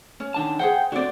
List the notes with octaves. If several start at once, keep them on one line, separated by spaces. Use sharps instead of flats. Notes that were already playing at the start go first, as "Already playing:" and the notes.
C#4
D#3 D4 A5
G#4 C5 F#5 G5
D3 C4 F#4 D5